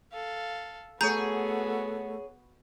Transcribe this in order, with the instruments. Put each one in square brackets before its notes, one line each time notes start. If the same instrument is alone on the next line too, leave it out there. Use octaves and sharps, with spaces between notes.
[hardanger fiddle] A4 F5
[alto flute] A3 [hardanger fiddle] B3 F#4 [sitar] G#4 C#5 [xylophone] A#5 G6